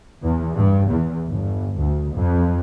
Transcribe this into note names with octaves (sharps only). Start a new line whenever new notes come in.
E2
G2
E2
G1
D2
F2